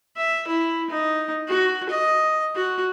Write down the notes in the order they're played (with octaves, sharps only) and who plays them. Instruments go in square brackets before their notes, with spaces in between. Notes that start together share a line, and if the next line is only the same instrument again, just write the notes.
[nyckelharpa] E5
E4
D#4
F#4
D#5
F#4